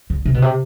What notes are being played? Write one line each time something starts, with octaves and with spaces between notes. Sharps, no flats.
D3
C3
B2
C3